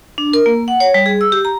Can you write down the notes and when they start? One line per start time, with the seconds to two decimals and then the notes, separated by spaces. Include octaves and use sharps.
0.18 D4
0.33 A#4
0.46 A#3
0.68 F#5
0.80 C#5
0.94 G3
1.06 G#4
1.21 E6
1.32 G4
1.45 A#5